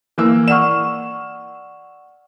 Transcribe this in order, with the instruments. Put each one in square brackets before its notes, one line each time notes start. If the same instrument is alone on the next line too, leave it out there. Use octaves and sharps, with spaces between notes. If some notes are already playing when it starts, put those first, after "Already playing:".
[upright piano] E3 A#3 E6
[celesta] D5 F#5 C#6 [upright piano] F6 E7